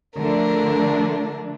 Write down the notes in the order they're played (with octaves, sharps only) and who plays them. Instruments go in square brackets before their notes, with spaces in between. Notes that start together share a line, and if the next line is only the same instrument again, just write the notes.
[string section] D3 F3 A3 D4 [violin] A#4